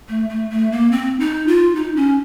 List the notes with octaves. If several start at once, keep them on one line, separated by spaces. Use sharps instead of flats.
A3
A3
A3
A#3
C4
D#4
F4
D#4
C#4